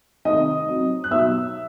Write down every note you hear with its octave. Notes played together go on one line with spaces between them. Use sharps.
C3 D#3 A3 C4 D#4 D#5 D#6
F#3 C4 D#4
F#6
B2 F#3 B3 D#4 E5 E6